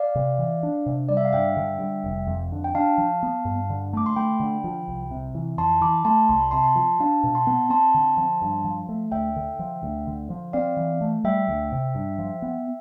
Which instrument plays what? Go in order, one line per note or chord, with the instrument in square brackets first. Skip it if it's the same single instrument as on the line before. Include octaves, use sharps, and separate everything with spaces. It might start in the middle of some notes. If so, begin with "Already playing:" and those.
Already playing: [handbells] D5 F5
[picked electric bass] C3
E3
D4
C3
[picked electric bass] G3 [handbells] D5
[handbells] E5
F5
[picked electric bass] G2 [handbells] E5 G5
[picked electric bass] D3
G3
F1
F2
D3
[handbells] G5
[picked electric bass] D4 [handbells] F5 A5
[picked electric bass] F3
B3
G2
D3
[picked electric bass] A3 [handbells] D6
[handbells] C6
[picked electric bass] A3 [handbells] G5 B5
[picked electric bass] D3
F3
C2
C3
E3
[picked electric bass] F2 [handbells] A5 C6
[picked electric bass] E3 [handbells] B5 D6
[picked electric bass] A3 [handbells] A5 C6
[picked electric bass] C2 [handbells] C6
[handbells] B5
[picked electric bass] C3 [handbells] A5 C6
[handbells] A5 C6
[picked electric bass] F3
[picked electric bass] D4 [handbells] F5 A5
[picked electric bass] B2
[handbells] A5 C6
[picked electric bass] B3
[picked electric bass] C4 [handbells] A5 C6
[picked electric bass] D3
F3
G2
F3
A3
[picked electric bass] D2 [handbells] E5 G5
[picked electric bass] D3
F3
D2
D3
F3
[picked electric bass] C4 [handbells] D5 F5
[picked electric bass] E3
A3
[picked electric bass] G3 [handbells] E5 G5
[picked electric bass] D2
C3
G2
F3
B3